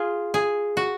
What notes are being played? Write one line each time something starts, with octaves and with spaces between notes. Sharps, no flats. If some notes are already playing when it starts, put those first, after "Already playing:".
Already playing: F4 G#4
G#4
F#4